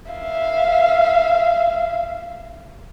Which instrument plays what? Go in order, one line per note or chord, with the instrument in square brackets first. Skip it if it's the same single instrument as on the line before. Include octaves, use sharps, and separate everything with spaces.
[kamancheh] E5 F5